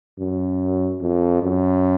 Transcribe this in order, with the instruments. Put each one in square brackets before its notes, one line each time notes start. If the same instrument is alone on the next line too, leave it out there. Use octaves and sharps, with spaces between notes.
[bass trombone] F#2
F2
F#2